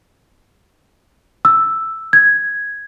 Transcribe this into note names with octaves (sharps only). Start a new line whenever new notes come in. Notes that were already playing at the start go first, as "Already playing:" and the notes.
E6
G#6